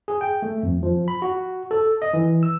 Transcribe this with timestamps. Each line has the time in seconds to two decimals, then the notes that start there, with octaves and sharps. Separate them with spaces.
0.08 G#4
0.21 G5
0.42 A3
0.63 F2
0.83 F3
1.08 B5
1.22 F#4
1.71 A4
2.02 D#5
2.13 E3
2.43 E6